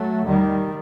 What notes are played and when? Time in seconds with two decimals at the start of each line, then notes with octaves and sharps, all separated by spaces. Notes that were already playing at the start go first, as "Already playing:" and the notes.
Already playing: F#3 A3
0.25 D#2 D#3 G3